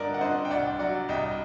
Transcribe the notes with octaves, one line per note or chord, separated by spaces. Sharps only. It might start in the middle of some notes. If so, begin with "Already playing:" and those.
Already playing: G2 D3 A#4 D5 D#5
F#5
D3 C5 D#5
G5
C2 D5 F#5
F#3 D5 F#5
C2 D#5 G5